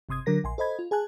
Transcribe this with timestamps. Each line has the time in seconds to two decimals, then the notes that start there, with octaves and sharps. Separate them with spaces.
0.09 G1 C3 C6 D#6 G#6
0.26 D3 F#3 A#4 A#6
0.44 A#1 G#5 C6
0.58 A4 C5 D#5 B5 G#6
0.79 F4
0.91 G#4 G#5 A5 F#6